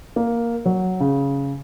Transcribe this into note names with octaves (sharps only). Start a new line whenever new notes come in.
A#3
F#3
C#3